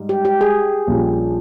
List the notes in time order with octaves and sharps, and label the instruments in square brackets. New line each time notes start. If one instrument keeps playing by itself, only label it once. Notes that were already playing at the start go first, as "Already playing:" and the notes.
Already playing: [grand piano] G#2 G3
[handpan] G4
G4
G#4
[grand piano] A#1 A#2 G3 C#4 G4